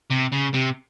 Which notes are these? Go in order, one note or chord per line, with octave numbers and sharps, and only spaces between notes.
C3
C#3
C3